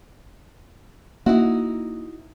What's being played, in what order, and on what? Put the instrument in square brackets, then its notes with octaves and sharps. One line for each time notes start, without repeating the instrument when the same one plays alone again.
[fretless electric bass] A#3 [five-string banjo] D#4 E4 F#4